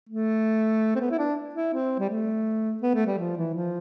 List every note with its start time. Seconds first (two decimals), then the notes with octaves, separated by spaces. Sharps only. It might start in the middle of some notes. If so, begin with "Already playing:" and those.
0.09 A3
0.95 C4
1.01 B3
1.11 E4
1.18 D4
1.55 E4
1.74 C4
1.99 G3
2.10 A3
2.82 B3
2.94 A3
3.06 G3
3.18 F3
3.37 E3
3.54 F3